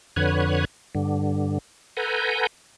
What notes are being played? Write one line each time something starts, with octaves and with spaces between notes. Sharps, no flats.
F2 D3 B4 C#5 F#6 G#6
G2 D3
A4 B4 F#5 G#5 A#5 G6